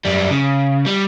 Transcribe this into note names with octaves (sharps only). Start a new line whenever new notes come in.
F#2 G3
C#3
G3